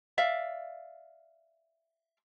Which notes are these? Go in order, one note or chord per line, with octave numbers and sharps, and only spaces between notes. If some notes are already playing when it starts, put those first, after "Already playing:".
D5 E5 F5